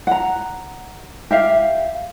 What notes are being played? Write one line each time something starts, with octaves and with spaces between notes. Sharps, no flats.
F#5 A#5
G4 E5 F5